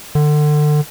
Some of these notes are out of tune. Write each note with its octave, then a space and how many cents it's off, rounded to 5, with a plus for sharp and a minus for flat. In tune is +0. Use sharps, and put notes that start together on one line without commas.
D3 +30